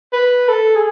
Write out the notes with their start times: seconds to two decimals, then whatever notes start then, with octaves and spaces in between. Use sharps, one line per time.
0.13 B4
0.49 A4
0.76 G#4